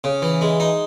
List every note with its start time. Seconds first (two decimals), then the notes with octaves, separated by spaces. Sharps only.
0.04 C#3
0.22 E3
0.41 G#3
0.60 D#4